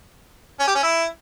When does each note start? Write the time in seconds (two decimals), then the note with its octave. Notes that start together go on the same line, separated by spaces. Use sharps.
0.60 C#4
0.67 G4
0.75 C#4
0.83 E4